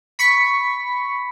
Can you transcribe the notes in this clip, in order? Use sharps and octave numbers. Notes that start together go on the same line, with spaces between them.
B5 C#6 B6